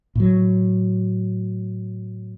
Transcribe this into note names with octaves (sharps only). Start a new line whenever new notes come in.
A2 F#3